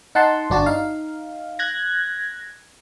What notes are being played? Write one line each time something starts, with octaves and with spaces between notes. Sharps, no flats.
D#4 F#5 A5 C6
G1 D4 F#4 A5
D#4 F5
F#6 G#6 A#6